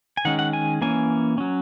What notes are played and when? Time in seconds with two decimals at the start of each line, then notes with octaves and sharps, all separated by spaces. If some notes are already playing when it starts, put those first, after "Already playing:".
0.17 G#5
0.25 D#3 G#3 C#4 F#5
0.39 F#5
0.53 G#5
0.81 E3 A#3 C#4 G#5
1.38 F#3 C#4